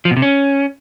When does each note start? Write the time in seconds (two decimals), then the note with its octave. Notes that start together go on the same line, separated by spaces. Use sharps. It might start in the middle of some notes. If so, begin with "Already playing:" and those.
0.05 F3
0.11 B2
0.17 C3
0.22 C#4